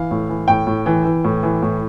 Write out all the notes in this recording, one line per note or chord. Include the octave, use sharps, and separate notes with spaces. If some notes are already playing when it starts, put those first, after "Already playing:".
Already playing: E3 F5
A2
E3
A2 G5
A2
E3
E3
A2
E3
A2